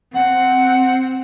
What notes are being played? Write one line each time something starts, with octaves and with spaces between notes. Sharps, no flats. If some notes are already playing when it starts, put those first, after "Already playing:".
C4 F#5